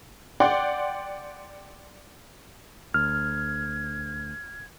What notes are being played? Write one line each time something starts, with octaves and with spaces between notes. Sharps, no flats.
D5 F#5 G5 C6
D2 F6 G#6